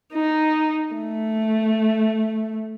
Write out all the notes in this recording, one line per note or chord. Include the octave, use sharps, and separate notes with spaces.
D#4
A3